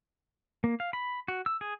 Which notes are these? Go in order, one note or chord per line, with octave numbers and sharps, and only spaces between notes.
A#3
F5
B5
F#4
E6
G#4